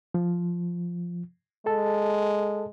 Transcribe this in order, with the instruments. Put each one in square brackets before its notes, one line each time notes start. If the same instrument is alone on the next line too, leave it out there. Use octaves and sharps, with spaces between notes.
[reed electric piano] F3
[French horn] G#3 [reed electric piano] A4 A5